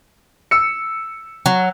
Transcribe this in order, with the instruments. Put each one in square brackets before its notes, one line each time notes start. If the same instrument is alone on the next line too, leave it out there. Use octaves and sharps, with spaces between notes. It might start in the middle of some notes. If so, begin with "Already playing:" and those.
[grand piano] E6 C#7
[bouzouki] F#3